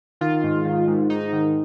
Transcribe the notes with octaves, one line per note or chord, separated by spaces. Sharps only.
D#3 F4
G#2
D#3
G#2
G#2 D#4
D#3